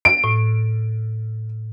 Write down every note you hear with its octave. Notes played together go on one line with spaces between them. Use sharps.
D7
A2